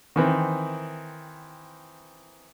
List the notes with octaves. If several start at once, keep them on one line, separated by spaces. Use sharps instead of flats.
D#3 E3 C4